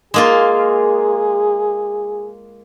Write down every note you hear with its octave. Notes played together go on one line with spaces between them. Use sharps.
G#3 A#3 F4 G#4